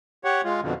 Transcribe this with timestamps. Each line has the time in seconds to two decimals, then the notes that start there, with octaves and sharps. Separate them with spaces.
0.24 G4 C#5 F#5
0.44 G#3 F4
0.62 F2 B2 D3